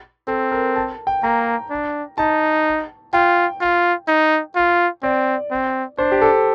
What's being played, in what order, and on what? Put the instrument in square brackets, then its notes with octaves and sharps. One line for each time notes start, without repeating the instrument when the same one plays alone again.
[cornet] C4 [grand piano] A4
[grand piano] A#4
A5
G5
[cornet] A#3 [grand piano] A#5
[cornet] D4
[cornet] D#4 [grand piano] A5
[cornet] F4 [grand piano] G5
[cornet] F4
D#4
F4
[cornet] C4 [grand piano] D5
[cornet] C4
[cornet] D4 [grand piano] C5
[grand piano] G4
A4